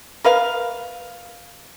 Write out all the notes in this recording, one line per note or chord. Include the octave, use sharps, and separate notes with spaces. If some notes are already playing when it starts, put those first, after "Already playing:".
A#4 B4 F5